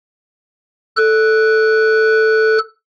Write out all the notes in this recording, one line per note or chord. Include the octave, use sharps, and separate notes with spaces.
A4 F#6